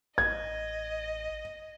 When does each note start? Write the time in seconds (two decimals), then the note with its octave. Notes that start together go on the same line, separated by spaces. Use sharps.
0.18 A1 D#5 G#6